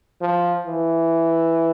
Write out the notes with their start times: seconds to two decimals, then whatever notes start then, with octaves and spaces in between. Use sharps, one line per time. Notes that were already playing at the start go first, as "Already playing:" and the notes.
0.21 F3
0.67 E3